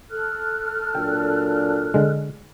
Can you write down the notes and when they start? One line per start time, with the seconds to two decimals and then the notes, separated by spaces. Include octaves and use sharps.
0.11 A4 F6 F#6
0.95 A#2 F#3 D4 G5
1.94 D3 G#3